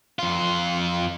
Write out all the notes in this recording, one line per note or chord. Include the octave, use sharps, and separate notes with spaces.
F2 F4